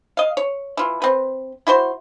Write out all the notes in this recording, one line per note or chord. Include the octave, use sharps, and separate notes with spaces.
D#5 F5
C#5
E3 F4
C4 B4
E4 F#4 C5 C6